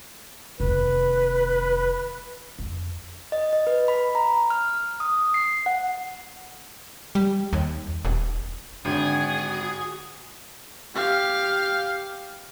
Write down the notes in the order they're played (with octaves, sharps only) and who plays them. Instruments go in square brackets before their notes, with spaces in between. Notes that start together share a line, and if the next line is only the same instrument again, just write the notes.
[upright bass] F1 D#2 [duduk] B4
[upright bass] F2
[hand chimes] D#5
D#5
B4
B5
A#5
F6
D#6
C7
F#5
[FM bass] G3
D#2
D#1
[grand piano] G#1 G5 [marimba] D3 D4 [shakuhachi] F#4 [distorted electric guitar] G#4
[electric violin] G4 F5